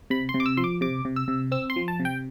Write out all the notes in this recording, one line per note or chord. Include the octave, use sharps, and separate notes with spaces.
C3 B5
C6
C3
D6
E6
F3 C6
D6
C3 D6
C3
E6
C3
C4 E6
C6
F3
A5
C3
G5